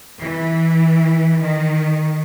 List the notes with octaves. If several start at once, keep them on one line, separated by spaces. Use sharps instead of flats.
E3
D#3